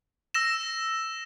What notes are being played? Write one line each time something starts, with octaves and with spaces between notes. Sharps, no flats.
E6 A#6 E7